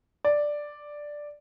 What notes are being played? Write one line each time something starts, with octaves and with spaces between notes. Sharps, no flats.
D5